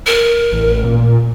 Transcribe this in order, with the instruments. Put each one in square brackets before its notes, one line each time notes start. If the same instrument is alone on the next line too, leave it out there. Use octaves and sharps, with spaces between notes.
[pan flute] A#4
[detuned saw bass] A1
A#2